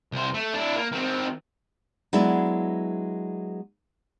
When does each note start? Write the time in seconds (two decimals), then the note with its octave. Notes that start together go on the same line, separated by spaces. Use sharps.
0.12 C2 C5
0.34 A3
0.54 D4 E4
0.76 A#3
0.92 D#3 C4
2.13 F#3 G#3 B3 D4 E4